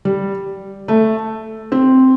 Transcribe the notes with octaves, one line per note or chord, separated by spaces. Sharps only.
G3
A3
C4